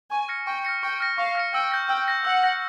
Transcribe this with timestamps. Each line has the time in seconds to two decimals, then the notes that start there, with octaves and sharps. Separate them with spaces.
0.11 G#5 C#6
0.29 F6 A#6 C#7
0.47 G5 C#6
0.65 F6 A#6 C#7
0.83 G5 C#6
1.00 F6 A#6 C#7
1.18 F5 C#6
1.35 F6 A#6 C#7
1.54 G5 E6
1.72 G6 A#6
1.89 G5 E6
2.08 G6 A#6
2.25 F#5 E6
2.43 G6 A#6